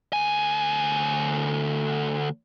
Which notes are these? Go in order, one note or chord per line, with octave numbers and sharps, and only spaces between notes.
D2 G#5